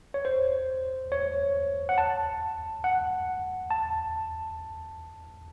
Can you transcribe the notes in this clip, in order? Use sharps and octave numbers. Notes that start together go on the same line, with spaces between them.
C#5
C5
C#5
F#5
A5
F#5
A5